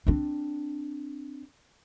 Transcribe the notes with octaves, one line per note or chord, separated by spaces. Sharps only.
C4 D4